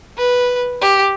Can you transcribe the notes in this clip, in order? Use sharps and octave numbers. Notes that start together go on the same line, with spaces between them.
B4
G4